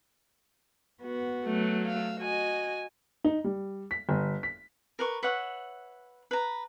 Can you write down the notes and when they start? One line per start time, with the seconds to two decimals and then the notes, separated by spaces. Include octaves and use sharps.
1.02 B3 F#4
1.45 F#3 A3
1.87 F5 E6
2.22 F#4 D#5 G#5
3.24 D#4
3.44 G3
3.91 B6
4.09 G1
4.43 B6
4.99 A#4 B4 C#6
5.23 B4 C#5 E5 F#5
6.31 B4 A#5